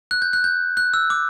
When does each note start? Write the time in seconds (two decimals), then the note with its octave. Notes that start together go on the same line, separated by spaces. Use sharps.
0.11 F#6
0.22 G6
0.33 F#6
0.44 G6
0.77 F#6
0.94 E6
1.10 D6